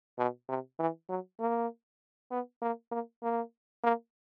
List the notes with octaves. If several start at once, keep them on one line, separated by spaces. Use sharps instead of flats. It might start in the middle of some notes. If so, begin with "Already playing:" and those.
B2
C3
E3
F#3
A#3
B3
A#3
A#3
A#3
A#3